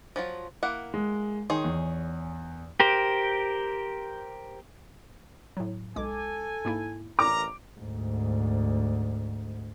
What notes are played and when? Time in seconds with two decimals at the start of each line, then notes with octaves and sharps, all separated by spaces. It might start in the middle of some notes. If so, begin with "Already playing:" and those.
0.16 F3 F#3 F4
0.63 A#3 E4 F#5
0.94 G#3
1.50 D#3 D#4 G#4 C#5 C6
1.64 E2
2.80 G4 A#4 C5
5.57 A2 F#3
5.96 B1 G#3 A4 G#5 D6
6.65 G#2 A#3 E4
7.19 A1 A#4 D5 A#5 D6
7.78 D2 G#2